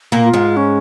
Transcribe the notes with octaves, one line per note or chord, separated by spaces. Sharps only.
A#2 A#3
F4
G#2 G#3
C#4